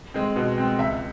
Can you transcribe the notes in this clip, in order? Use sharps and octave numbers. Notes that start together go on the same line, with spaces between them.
G#3 C4
B2
G#3 C4
C#2 E5